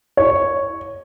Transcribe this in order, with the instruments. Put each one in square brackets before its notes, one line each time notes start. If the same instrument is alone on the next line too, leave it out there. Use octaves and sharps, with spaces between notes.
[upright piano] C#5